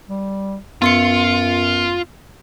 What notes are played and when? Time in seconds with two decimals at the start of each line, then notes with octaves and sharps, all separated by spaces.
0.09 G3
0.82 F#2 B3 F4 C6 C#7